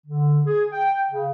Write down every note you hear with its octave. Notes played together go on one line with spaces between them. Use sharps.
D3
G#4
G5
C#3